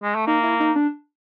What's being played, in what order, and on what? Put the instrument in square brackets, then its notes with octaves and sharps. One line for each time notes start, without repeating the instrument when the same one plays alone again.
[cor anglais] G#3
A3
[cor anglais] A#3 [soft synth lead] D#4
[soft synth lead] E4
D#4
D4